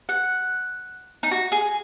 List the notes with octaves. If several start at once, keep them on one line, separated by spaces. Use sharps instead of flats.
F#5
D#4
F#4
G#4